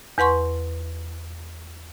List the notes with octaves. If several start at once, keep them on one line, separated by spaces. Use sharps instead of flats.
E2 B4 F#5 C6 C#6